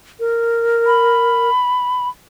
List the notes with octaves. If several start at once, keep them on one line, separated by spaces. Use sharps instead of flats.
A#4
B5